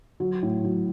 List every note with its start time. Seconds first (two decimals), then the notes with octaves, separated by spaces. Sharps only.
0.20 F#3
0.42 A2
0.64 F#3